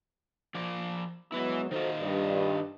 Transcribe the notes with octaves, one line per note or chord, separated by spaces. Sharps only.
F3 D5
F#3 G#3 B3 E4 B4
D#3 D#4 F4 F#4 A4 C5
G2